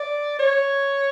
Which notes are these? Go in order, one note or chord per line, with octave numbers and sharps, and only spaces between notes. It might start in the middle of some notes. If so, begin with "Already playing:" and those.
Already playing: D5
C#5